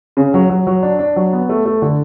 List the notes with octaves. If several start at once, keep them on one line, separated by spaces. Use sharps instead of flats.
C#3
F#3
F#3
F#3
D4
D4
F#3
B3
A3
A3
D3